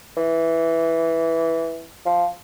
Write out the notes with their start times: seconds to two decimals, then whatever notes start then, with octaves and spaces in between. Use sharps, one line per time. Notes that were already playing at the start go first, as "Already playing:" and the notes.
0.17 E3
2.06 F3